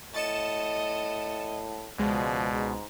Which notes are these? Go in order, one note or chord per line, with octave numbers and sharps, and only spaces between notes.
A2 D#5 A6 C#7 E7
C#2 B2 F3 G#3 D5
G#2